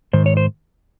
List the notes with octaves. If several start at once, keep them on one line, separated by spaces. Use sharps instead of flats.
G#2 D#3 C5
C#5
C5